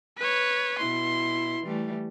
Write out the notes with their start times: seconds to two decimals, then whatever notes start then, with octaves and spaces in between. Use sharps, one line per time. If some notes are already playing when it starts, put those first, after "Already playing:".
0.18 B4 C#5
0.78 B2 E4 C6
1.63 E3 G3 A3